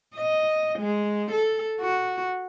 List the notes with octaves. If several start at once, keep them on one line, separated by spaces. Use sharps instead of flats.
D#5
G#3
A4
F#4